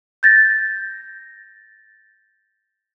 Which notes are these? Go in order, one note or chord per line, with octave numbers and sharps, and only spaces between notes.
G6 A6 A#6